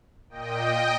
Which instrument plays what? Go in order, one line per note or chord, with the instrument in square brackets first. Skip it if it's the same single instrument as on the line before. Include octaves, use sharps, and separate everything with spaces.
[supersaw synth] A#2 D#5 G5